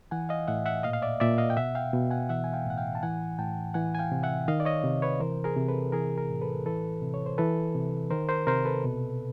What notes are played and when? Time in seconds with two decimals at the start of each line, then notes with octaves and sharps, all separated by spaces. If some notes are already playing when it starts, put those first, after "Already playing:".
0.11 E3 F#5 G#5
0.29 D#5 F5
0.47 A2 E5 F#5
0.66 E5 F#5
0.83 A#2 D#5 F5
0.93 F5
1.02 D5 E5
1.20 A#2 D5 E5
1.38 D#5 F5
1.50 G5
1.57 B2 E5 F#5
1.75 F5 G5
1.93 B2
2.11 F#5 G#5
2.29 E3 E5 F#5
2.44 G#5
2.53 F5 G5
2.65 A2 F#5
2.78 F5 G5
2.95 A5
3.03 E3 F#5 G#5
3.38 A2 G5 A5
3.74 E3 F#5 G#5
3.95 G#5
3.99 F5 G5
4.12 C3
4.23 E5 F#5
4.48 D#3 D#5 F5
4.60 D5
4.65 C#5 D#5
4.84 C3
5.02 B4 C#5
5.20 E3 A#4 C5
5.44 G#4 A#4
5.56 C3
5.68 A4 B4
5.92 E3 G#4 A#4
6.17 G#4 A#4
6.30 A2
6.42 A4 B4
6.66 E3 A4 B4
7.02 C3
7.14 C#5
7.26 C5
7.38 E3 A4 B4
7.74 C3
8.11 D#3 A#4 C5
8.29 A#4 C5
8.47 C3 A#4 C5
8.65 A4 B4
8.84 B2